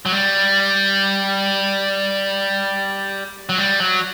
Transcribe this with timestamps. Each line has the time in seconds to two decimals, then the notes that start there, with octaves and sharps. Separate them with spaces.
0.06 F#3
0.12 G3
3.49 F#3
3.58 G3
3.80 F#3